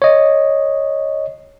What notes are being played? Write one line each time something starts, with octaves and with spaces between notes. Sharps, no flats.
C#5 D#5